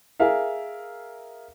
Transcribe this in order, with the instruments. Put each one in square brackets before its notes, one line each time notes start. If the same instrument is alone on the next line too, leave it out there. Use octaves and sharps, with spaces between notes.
[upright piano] G#4 A#4 E5 F5